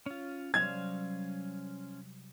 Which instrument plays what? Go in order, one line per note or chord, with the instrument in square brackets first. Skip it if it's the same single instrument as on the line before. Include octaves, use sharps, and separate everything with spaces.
[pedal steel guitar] C#4 F4
[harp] C3 F#3 G3 [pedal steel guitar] C#4 C5 F5 [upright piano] G#6